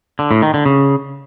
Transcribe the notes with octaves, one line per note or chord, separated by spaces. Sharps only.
D3
A2
D#3
D3
C#3